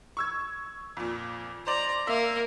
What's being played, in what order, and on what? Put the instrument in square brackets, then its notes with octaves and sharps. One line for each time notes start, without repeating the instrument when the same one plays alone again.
[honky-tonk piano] C#6 E6 G#6
F2 A#2
[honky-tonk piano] C5 D5 [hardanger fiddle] A#5
[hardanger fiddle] A#3 A#4 [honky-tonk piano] E5